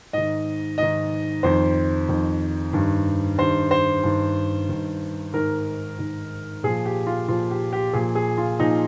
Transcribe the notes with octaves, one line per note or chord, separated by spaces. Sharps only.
G#2 D#3 D#5
G#2 D#3 D#5
F2 D#3 C5
F2 D#3
G2 D#3
G2 D#3 C5
C5
G2 D#3
G2 D#3
G#2 D#3 A#4
G#2 D#3
A#2 F3 G#4
G4
F4
A#2 F3 F4
G4
G4
A#2 F3 G#4
G#4
F4
A#2 F3 D#4